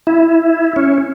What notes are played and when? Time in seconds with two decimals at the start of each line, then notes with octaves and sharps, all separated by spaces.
0.07 E4
0.76 C#4